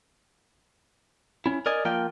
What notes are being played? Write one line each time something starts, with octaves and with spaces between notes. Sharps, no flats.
C#4 E4
A#4 D5 D#5 G#5
F3 A#3 F4 G5